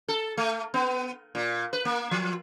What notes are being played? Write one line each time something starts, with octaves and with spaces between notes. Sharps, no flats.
A4
A3
B3
A#2
B4
A#3
F3